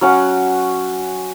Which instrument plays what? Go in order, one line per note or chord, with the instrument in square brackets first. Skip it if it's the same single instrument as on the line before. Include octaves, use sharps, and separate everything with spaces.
[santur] F#3 C#4 F#5